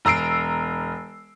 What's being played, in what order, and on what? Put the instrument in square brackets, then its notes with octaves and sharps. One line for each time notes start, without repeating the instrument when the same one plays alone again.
[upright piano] E1 A#5 E6 C7 D7